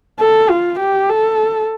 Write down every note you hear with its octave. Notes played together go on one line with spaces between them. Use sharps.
A4
F4
G4
A4